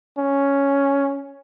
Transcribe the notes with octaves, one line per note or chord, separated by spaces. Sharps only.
C#4